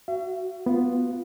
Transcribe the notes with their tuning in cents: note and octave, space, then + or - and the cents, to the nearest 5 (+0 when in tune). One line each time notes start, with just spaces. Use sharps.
F#4 +15 E5 +45
B3 +0 F4 +0